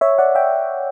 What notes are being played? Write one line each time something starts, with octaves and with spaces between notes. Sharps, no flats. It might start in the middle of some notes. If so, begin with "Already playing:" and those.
C#5 E5
D5 F#5
E5 G5